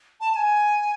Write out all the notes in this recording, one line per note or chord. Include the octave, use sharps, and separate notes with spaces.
A5
A5
G#5